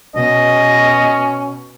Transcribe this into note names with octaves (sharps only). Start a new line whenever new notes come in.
B2 C#4 D#5